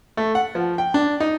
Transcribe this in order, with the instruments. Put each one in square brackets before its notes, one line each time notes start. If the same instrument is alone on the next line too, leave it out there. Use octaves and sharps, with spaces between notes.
[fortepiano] A3
F#5
F3
G5
D4
D#4